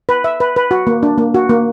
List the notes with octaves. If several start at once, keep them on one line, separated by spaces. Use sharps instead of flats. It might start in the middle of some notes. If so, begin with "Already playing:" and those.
B4
E5
B4
B4
F#4
A#3
D4
A#3
F#4
A#3